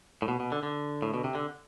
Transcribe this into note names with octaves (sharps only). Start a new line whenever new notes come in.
A2
B2
B2
D3
D3
A2
B2
C3
D3